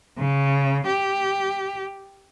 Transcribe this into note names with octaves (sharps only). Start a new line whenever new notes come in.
C#3
G4